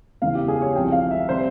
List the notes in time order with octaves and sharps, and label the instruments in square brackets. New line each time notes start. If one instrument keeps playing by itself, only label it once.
[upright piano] E2 C#3 E3 F5
G4
G#4
C#5
C2 C3 F3 G5
F5
E5
C3 G3 C5